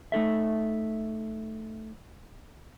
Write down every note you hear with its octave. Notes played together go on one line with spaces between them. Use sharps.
A3 D#4 A4 E5